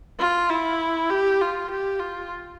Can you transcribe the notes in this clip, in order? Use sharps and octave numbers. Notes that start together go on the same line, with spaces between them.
F4
E4
G4
F4
G4
F4